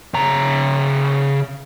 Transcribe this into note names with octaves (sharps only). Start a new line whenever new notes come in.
C#3 A#5